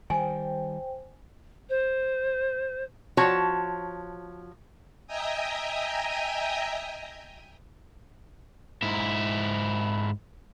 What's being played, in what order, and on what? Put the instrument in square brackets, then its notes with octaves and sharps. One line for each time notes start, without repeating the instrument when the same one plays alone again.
[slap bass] D#3 G3 [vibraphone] C5 G5 [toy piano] G#5
[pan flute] C5
[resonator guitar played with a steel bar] F3 F#4 C#5 A5
[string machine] D#5 E5 G5 G#5 A#5 D#6
[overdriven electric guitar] G#2 E4